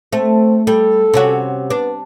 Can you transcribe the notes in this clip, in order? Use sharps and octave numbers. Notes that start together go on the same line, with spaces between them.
A3 C4
G3 A4
C3 C#4 F#4
B3 D4